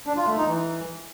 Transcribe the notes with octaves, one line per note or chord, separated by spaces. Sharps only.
D4
F4
A3
D#4
E3